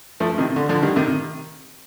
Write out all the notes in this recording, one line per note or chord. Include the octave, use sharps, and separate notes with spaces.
F3 A3
C3 D#3
D3
D3 F3
D#3 G3
C3 D#3